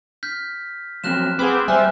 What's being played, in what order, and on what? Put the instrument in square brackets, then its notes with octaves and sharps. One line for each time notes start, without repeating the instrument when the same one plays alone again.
[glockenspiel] F6 G6 B6
[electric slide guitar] F3 F#3 C4 [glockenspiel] F6 F#6 E7
[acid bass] C4 [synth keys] G#4 B5 D6 [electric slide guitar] B4 F#5
[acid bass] G3 [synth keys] C5 E5 [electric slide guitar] G#5 [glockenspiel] F6 F#6